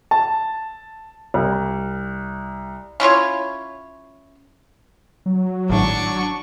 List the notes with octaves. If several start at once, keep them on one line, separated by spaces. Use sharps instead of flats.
A5
C2
C#4 E4 F4 C#5
F#3
G#1 A2 D4 C#6